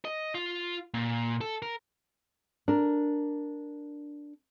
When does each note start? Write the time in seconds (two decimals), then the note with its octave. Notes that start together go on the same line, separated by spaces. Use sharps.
0.05 D#5
0.35 F4
0.94 A#2
1.41 A4
1.62 A#4
2.68 D4 A#4